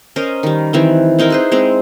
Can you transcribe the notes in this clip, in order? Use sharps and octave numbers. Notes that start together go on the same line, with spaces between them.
C#4 A#4 C5 D#5
D#3 G3
D#3 E3 C4
C4 D#4 E4 A#4
G#4 B4 C5
G#3 C4